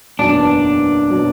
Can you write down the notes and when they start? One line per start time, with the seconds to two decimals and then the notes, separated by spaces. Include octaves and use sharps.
0.19 F#1 E2 B2 F#3 D4
1.11 B2 F#3